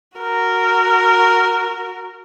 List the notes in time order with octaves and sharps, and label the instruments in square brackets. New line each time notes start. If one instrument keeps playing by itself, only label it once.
[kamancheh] F#4 A#4